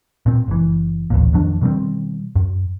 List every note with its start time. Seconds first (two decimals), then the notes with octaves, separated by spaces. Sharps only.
0.26 A#2 C4
0.48 F#1 E3
1.10 A1 D2 A#2
1.34 F2 D#3 F#3 D4
1.61 B2 D#3 G3 C4
2.36 F#2